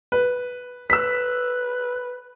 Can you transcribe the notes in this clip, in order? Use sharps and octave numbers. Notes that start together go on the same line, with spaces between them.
B4
B4 E6 B6